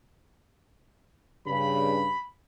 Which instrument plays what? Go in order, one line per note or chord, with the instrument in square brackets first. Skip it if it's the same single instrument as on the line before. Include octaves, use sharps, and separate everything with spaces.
[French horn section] G2 C#3 [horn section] B5